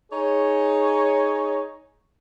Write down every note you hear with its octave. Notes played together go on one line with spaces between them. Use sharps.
D#4 G#4 C#5